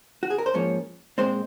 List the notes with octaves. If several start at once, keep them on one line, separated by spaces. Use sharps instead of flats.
F#4
G#4
A#4
C5
G#2 F3 A#3 C#4 C#5
A#2 G#3 C4 C5